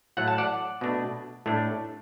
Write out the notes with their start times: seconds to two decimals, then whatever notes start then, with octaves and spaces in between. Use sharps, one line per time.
0.17 A2 F#3 A3 F#5
0.28 A5
0.38 D5 F#5
0.81 B2 A3 D4
1.46 A2 A3 D4